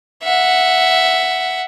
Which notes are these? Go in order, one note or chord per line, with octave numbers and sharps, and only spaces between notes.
E5 F#5